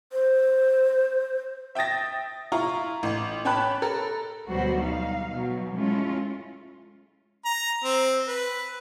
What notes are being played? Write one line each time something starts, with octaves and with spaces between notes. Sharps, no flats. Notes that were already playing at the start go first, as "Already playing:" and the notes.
C5
E5 G5 D#6 A6 A#6
E4 F4 A#5 C#6
A1
C#4 C#5 G5 A5 B5 F#6
A4 A#4
D2 B2 F#3 G3 F#4 C5
D#4 F5
B2 F#3
G#3 A3 C#4 E4 F4
A#5
C4
B4